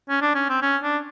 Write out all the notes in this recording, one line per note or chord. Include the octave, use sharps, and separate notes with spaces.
C#4
D4
C#4
C4
C#4
D4